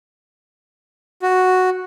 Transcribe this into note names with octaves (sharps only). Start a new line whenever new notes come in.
F#4